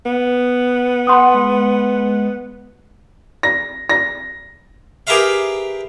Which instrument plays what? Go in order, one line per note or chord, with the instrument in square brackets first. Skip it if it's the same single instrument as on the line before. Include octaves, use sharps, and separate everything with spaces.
[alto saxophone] B3
[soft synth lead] F#5 [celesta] B5 C6 D#6
[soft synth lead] G#3
[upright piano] A#6
A#6
[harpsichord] G4 G#4 A#4 B4 E5 F5